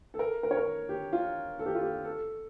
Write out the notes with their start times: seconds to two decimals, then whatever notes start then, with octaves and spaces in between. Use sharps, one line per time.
0.14 A4
0.19 A#4
0.43 A#4
0.51 C#5
0.57 A#4
0.89 G4
1.13 F4
1.59 A4
1.66 G4
1.75 F4
1.81 G4
2.05 A4